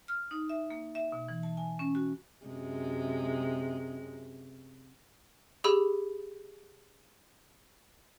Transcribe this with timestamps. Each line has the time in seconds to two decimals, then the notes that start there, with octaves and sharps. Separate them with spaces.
0.08 F6
0.31 D#4
0.49 E5
0.70 A#3
0.95 E5
1.12 B2
1.28 E3
1.43 A5
1.57 G#5
1.79 C#4
1.95 F#4
2.45 F#2 C3 G#3
5.64 G4 G#4 B5 E6